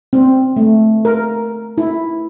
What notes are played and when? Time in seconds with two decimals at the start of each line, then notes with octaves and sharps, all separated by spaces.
0.13 C4
0.56 A3
1.05 A#4
1.78 E4